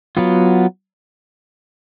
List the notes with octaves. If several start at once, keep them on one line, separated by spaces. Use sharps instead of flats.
F#3 B3 F4